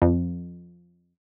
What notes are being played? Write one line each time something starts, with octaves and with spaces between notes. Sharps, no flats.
F2